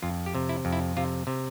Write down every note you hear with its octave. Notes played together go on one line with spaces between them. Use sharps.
F2 F4
G4
C3
E4
F2
E4
C3 F4
C3